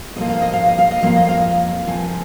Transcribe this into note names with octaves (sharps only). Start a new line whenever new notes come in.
F2 F3 A#3 D#5
F5
D#5
F5
D#5
F5
D#5
F2 F3 A#3 F5
D#5
F5
D#5
C3 F3 A#3 G#5